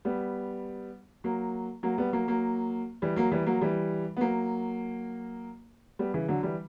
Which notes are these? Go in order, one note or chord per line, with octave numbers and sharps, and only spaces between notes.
G3 B3
F#3 A#3
F#3 A#3
G3 B3
F#3 A#3
F#3 A#3
E3 G3
F#3 A#3
E3 G3
F#3 A#3
E3 G3
B3
F#3 A#3
G3 B3
C#3 E3
D3 F#3
E3 G3